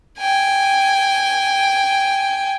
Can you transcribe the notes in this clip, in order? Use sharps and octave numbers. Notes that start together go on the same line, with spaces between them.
G5 G#5